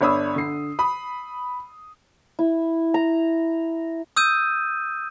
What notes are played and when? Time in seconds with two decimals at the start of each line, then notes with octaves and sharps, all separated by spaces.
0.01 G1 D4 C#5 B5 D#6 E6
0.36 D3 C7
0.79 B5 D#6
2.39 E4
2.94 A#5
4.16 D#6 E6 G6 D#7